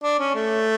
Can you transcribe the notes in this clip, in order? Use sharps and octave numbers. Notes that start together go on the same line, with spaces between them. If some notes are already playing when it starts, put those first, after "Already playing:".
D4
C#4
A3